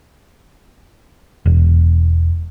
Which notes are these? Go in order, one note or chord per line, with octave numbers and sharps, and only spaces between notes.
E1